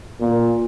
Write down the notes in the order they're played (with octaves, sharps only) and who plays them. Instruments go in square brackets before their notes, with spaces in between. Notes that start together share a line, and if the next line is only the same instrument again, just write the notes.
[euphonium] A#2